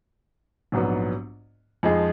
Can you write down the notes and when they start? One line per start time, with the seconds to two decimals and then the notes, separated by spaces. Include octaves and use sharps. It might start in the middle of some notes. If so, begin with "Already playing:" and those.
0.72 A#1 G#2 F#3 B3
1.83 F2 F3 G#3 D#4 G#4